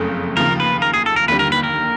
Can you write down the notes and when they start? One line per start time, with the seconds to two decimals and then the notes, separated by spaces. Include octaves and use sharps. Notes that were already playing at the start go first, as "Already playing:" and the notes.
Already playing: F#1 F2 C#3 A3
0.37 D#2 C#3 F3 A#4
0.60 B4
0.82 A#4
0.94 G#4
1.06 A4
1.16 A#4
1.28 D#2 D3 G3 B4
1.39 A#4
1.52 B4
1.63 A#4